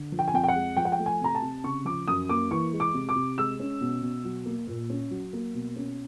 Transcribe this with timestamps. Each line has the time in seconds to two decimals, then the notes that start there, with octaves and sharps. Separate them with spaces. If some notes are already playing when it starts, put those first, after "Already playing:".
Already playing: D3
0.12 F3
0.19 G5
0.28 G#5
0.34 F2 G5
0.44 G5
0.48 F#5
0.55 G#3
0.77 F3 G5
0.85 F#5
0.92 G5
0.99 A3
1.06 G#5
1.21 C3 A#5
1.35 A5
1.42 C3
1.64 C#3 C#6
1.85 F3 D6
2.08 F#2 D#6
2.29 A#3 D6
2.51 E3 C#6
2.73 G#3
2.80 D6
2.94 C3
3.09 D6
3.16 C3
3.38 G#3 E6
3.60 C#4
3.81 B2
4.02 B2
4.25 F#3
4.46 A#3
4.67 A#2
4.90 C#4
5.11 F#3
5.33 A#3
5.54 B2
5.76 C#4